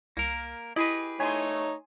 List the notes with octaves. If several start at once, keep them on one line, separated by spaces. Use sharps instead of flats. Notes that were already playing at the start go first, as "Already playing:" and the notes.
C2 A#3 A#4
E4 G4 G#4 B4 D#5
A3 D#4 C#5 G#5 C6